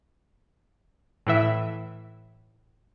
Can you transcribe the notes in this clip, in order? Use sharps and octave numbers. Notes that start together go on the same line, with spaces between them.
A2 E3 E5